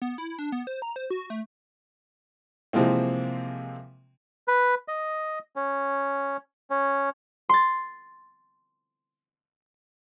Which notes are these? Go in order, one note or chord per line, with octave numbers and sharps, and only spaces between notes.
B3
E4
D4
B3
C5
A#5
C5
F#4
A3
C3 E3 F3 G#3 A#3 C4
B4
D#5
C#4
C#4
C6 A6